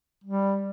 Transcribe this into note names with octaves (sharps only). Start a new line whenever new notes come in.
G3